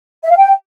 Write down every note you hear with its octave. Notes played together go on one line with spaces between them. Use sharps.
E5
F5
G5